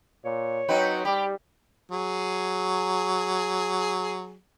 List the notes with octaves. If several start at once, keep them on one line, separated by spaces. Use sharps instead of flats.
A#2 C#5
F#3 C4 D#4 B4
G3 G4 B5
F#3 G#4